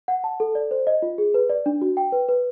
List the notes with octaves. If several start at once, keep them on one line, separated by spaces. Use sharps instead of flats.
F#5
A5
A4
D5
C5
D#5
F4
G#4
B4
D5
D4
F#4
G5
B4
B4